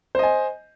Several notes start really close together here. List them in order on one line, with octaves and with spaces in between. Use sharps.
C5 D#5 G#5